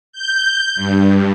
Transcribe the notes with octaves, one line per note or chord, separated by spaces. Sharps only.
G6
G2